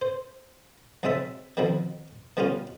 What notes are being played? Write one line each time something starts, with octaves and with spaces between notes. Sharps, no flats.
C5
B1 C#3 G#3 C4 E5 A5
B2 D3 D#3 F3 C4
B2 D3 G3 B3 C#4 F4